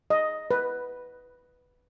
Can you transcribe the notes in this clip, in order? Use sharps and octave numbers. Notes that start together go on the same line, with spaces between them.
D#5
B4